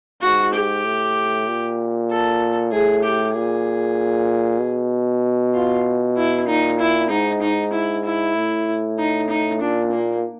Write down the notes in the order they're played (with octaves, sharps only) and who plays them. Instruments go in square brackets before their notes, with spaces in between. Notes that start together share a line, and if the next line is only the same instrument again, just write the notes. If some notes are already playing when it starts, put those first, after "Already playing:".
[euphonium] G#2 [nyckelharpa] F#4
[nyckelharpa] G4
[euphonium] A2
A#2
[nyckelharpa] A4
[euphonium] A2 [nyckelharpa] G#4
[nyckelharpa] G4
[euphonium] A#2 [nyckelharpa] G#4
[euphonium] B2
[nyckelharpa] F4
E4
[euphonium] A#2 [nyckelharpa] D#4
[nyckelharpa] E4
[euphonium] G#2 [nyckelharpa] D#4
[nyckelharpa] D#4
E4
E4
[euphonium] A2
[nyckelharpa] D#4
D#4
[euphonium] A#2 [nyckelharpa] D4
[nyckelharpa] A#3